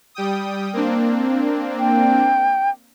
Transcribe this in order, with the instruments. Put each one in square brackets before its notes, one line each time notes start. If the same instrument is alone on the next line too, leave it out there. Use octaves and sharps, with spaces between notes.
[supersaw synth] G3 G5 D#6
A#3 C4 D4
[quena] G5